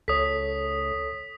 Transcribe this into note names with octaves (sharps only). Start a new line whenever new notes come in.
C#2 A4 C#5 D#6 B6